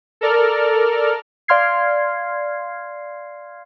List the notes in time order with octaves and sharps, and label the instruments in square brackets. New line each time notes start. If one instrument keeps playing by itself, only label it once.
[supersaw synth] A4 A#4 D5 F6
[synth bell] D5 F5 C6 F6 G#6 C7